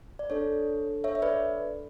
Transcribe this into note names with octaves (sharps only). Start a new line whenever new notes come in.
D5
D4 A4 C#5
C#5 E5
E5
B4 D5